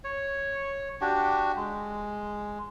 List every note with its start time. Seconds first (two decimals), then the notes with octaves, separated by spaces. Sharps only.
0.04 C#5
1.01 D4 F#4 G4
1.56 G#3